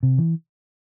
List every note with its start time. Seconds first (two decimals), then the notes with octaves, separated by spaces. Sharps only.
0.03 C3
0.18 E3